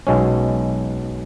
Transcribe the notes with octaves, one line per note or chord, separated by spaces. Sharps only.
B1 B2 G#3 C#4